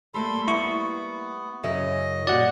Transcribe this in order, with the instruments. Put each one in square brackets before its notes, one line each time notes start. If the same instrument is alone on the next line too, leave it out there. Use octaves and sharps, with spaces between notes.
[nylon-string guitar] G3 A3 A#3 [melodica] A4 B5 C6
[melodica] B3 [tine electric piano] E4 C#6
[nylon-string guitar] F#2 C#3 E5 [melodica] D#5
[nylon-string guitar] A#2 G3 F#4 [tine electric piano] D5 F#5